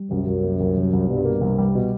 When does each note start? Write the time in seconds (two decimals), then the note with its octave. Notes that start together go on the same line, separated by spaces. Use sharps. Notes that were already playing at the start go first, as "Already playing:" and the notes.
Already playing: G3
0.10 C2 F#2
0.27 C2
0.43 A#3
0.60 C2
0.76 C2
0.93 C2
1.08 G2 B2
1.25 A#3
1.41 C2 G2
1.58 G3
1.75 B2